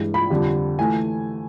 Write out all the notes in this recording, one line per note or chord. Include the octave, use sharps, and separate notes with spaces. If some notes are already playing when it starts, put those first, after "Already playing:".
Already playing: G2 E3 G#3
B5
F2 D3 G3
E3 A3 G#5